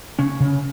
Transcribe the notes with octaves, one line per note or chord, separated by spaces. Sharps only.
C#3 C#4
C#3